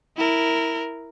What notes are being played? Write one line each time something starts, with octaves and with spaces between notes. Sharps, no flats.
E4 A#4